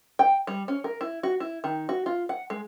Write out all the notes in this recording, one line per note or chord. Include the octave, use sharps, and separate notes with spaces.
G5
G3
C#4
A#4
E4
F#4
E4
D#3
F#4
F4
F#5
G#3